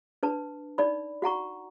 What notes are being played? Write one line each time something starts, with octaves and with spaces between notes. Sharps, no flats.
D4 B4 A5
D#4 D5 B5
F#4 F#5 A#5 C#6